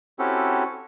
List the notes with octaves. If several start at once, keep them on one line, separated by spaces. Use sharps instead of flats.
C4 C#4 E4 F#4 G4 A4